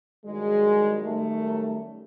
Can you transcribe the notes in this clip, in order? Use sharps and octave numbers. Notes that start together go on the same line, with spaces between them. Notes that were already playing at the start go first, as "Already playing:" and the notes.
G2 D#3 F#3 G#3
F#2 D#3 G3 A3